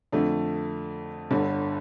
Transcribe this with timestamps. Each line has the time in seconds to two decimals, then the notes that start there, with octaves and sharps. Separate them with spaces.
0.12 F2 D3 A3
1.30 G1 G2 D3